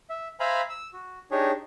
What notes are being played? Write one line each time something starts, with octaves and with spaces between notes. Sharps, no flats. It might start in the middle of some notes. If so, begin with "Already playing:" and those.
E5
C5 E5 F5 G#5 A#5 B5
E6
F#4
D4 D#4 G4 G#4 C#5